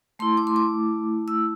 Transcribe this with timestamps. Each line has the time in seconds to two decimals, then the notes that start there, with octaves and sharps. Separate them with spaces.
0.19 A3 E4 C6
0.37 D6
0.47 C6
0.56 D6
1.28 E6